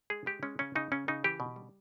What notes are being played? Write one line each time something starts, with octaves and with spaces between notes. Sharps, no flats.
G#3 G#4
G#3 G4
G#3 C#4
C#3 C#4
C#3 D#4
C#3 C#4
C#3 D#4
E3 G4
B2
G3